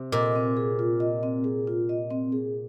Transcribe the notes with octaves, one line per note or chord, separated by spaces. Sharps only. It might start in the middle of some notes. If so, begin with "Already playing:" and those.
Already playing: C3
A#2 D#5
C4
G#4
F4
D#5
C4
G#4
F4
D#5
C4
G#4